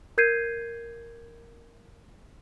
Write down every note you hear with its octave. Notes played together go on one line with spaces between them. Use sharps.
A#4 G6 G#6 C7 D#7